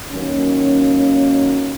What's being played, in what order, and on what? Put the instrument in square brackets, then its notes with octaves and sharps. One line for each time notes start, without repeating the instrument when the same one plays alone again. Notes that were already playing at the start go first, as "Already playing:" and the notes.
[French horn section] D#3 F#3 A#3 C#4